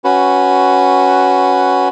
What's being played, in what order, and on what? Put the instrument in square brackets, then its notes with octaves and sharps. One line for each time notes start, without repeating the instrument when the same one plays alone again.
[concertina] C#4 F#4 B4